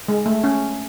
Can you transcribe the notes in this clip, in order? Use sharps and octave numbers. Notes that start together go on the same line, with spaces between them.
G#3
A3
C#4